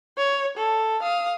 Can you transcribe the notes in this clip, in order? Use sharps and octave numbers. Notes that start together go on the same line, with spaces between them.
C#5
A4
F5 D#6